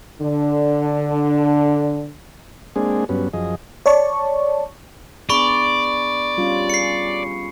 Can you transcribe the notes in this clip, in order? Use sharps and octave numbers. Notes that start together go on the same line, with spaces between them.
D3 D4
G#3 A#3 C4 D4 G#4
G2 F#3 B3 C#4
F#2 F3 G#4 D#5
C#5 D5 A5 C#6
B3 D4 G#4 D5 B5 C#6
G3 C#4 F4
G#4 C7 C#7